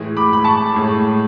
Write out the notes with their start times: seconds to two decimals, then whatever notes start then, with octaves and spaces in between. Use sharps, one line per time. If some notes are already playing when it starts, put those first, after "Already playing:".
Already playing: A2 E3 G#3
0.17 B5 D6
0.33 B5
0.44 A5 C#6
0.73 A2 G#3